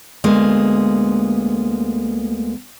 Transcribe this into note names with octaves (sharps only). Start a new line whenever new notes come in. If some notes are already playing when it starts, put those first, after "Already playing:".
D2 G#3 A#3 B3